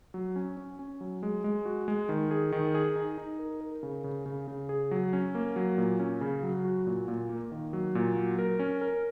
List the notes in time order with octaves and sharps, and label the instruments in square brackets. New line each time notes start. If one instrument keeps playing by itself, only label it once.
[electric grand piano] F#3
C#4
C#4
C#4
F#3
G#3
G#3
F#4
G#3
D#3
G#4
D#3
G#4
D#4
D#4
A#4
A#4
C#3
C#3
C#3
C#3
G#4
F#3
C#4
A#3
F#3
A#2
C#4
C#3
F#3
F#4
A#2
A#2
A#3
D#3
F#3
A#2
F#3
A#4
C#4
A#4